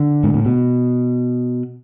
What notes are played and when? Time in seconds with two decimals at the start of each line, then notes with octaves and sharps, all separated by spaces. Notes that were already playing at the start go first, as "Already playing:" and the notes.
Already playing: D3
0.23 G#2
0.34 A2
0.45 B2